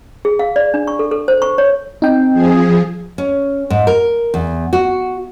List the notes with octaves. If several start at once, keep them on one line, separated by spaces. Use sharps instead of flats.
G#4
F5
D5
D4
C#6
A4
A4
C5
C#6
C#5
C4 D#4 G5
F3 G#4
C#4
G#2
A#4
E2
F#4